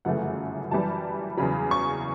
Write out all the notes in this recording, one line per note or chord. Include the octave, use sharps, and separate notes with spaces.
G1 F#2 C#3 E3 A3 F#5
F#2 E3 G3 A5
E2 C#3 F#3 B5
C#6